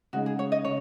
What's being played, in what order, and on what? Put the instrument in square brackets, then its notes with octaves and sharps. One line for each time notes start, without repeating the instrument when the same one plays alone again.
[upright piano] C#3 G#3 D#4 [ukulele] F#4
[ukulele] G#4
C#5
D#5
[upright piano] C#3 [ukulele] C#5